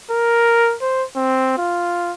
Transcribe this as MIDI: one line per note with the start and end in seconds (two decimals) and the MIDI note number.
0.11 0.75 70
0.82 1.04 72
1.16 1.55 60
1.58 2.12 65